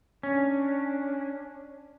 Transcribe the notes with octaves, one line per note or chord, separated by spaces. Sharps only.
C#4 D4